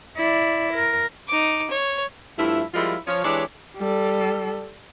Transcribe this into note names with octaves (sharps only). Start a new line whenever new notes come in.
E4 D5
A#4
D#4 D6
C#5
G2 F3 A3 E4
F3 G3 G#3 E4 F4 A#4
F3 C#5
E3 G#3 D4 G4 C#5
G3 A4